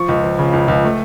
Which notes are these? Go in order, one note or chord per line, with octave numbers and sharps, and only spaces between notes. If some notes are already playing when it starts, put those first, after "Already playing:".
Already playing: F3 C#6
C#2
F3
C#3
C#2
C#2
A3